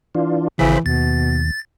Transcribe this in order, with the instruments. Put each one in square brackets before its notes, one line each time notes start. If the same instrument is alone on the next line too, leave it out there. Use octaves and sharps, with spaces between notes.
[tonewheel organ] E3 D4 F4
[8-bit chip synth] G#1 C#3 [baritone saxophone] E3 [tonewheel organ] C5 B5
[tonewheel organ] D#2 [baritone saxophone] B2 [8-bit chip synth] A6